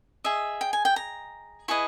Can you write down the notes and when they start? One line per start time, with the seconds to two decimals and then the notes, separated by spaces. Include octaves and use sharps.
0.24 G#4 D#5 E5
0.61 G5
0.73 G#5
0.85 G5
0.96 A#5
1.68 E4 G#4 B4 D#5 C#6